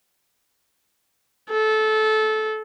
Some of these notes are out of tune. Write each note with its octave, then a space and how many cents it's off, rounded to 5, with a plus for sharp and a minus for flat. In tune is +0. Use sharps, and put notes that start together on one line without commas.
A4 -20